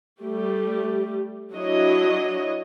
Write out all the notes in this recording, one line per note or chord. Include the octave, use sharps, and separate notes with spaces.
G3 A3 G4
F#3 D4 E4 F#4 C#5 D#5